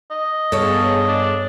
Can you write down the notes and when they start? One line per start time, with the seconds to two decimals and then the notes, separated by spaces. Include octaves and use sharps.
0.11 D#5
0.52 G2 B3 G#4 A4 C#5 F5
1.08 D4